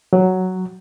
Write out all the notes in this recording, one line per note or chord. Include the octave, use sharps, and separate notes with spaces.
F#3